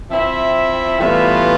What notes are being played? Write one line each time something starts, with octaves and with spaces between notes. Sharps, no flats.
F3 C4 E4 E5
A2 E3 G3 B3 F4 E5